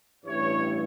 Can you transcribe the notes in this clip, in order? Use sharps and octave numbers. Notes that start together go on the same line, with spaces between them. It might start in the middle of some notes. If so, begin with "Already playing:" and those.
A1 G2 E3 G3 C#5